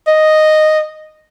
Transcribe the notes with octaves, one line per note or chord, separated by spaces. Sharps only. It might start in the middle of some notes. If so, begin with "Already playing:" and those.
D#5